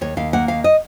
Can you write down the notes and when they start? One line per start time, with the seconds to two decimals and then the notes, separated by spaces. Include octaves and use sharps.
0.01 D#2 C#5
0.17 D#2 F5
0.33 A#3 F#5
0.48 D#2 F5
0.64 D#5